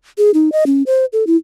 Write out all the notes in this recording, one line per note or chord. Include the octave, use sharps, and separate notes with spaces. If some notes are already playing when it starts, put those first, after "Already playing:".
G#4
D#4
D#5
C#4
C5
A4
E4